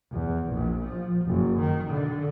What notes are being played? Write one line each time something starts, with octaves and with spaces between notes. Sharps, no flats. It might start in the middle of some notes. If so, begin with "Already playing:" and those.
E2
A#1
F3
F#1
D#3
D3